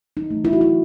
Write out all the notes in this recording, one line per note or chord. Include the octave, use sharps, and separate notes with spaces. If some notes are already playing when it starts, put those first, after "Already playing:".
D#4
E3 A3
E4
F#4
E4